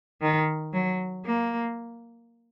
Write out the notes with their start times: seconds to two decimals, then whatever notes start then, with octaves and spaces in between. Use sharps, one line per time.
0.21 D#3
0.73 F#3
1.26 A#3